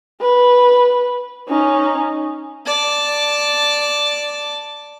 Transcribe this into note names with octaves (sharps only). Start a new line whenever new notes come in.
B4
C#4 D#4
D5 A5